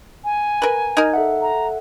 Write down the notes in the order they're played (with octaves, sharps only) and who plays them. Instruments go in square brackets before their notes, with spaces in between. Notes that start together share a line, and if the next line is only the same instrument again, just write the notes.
[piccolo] G#5
[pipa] A#4 B4
[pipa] D#4 A#4 [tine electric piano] G#6
[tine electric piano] A4 E5 F#5
[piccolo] A#5